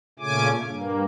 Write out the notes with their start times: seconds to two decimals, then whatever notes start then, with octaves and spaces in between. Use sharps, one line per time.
0.19 A#2 C#3 A3 C#4 G#5 D6
0.65 G2 A#3